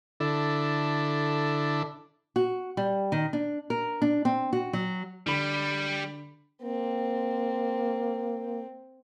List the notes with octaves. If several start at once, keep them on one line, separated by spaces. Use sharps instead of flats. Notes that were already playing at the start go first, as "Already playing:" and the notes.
D3 D4 E4 A4
F#4
G3
D#3
D4
A#4
D4
C4
F#4
F#3
D3 G3 B5
A#3 C4